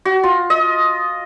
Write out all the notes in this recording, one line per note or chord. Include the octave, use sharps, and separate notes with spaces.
F#4
F4
D#5